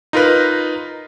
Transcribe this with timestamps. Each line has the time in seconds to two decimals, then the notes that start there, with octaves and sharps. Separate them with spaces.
0.13 D#4 F4 A#4 B4